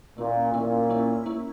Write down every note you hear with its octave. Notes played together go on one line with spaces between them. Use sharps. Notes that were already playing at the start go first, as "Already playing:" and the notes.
A#2 A#3 C#4 E4
A#2 A#3 C#4 E4
A#3 C#4 E4
A#3 C#4 E4